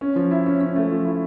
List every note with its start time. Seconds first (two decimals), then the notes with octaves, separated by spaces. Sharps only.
0.01 C#4
0.16 F3
0.31 E4
0.46 C#4
0.61 C#4
0.76 A3
0.91 F3
1.05 E4